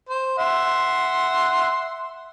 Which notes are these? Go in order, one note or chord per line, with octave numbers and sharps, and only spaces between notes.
C5
E5 F#5 C6